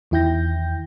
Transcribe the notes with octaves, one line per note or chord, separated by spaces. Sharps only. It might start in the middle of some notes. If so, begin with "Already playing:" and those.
E2 D#3 E4 G5 G6 A#6